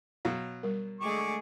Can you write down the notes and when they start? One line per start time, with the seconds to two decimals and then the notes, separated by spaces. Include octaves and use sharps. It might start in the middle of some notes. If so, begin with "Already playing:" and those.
0.25 B2 F#3 F5
0.63 G3 A#4
1.01 D3 G#3 A3 G#4 C#6 D6